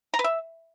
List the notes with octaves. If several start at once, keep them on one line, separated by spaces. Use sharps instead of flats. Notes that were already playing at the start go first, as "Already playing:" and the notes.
A#5
B4
E5